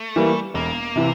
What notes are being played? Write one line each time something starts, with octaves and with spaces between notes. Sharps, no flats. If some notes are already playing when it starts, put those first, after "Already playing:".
Already playing: A3
E3 G3 A#3
E1 A#3
C3 E3